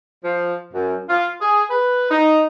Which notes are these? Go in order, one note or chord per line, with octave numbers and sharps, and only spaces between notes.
F3
F#2
F4
G#4
B4
D#4